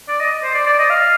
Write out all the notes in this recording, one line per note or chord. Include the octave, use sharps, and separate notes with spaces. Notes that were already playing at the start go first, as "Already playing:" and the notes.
D5
D#5
C5
D5
D5
D#5
F5